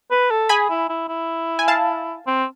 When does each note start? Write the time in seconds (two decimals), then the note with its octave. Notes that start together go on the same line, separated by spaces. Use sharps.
0.11 B4
0.30 A4
0.49 G#4 G#5 B5
0.70 E4
0.89 E4
1.09 E4
1.59 G#5
1.68 F5 A5
2.27 C4